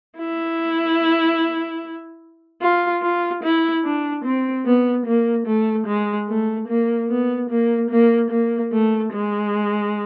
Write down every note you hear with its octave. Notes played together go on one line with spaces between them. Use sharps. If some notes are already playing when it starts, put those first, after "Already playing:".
E4
F4
F4
E4
D4
C4
B3
A#3
A3
G#3
A3
A#3
B3
A#3
A#3
A#3
A3
G#3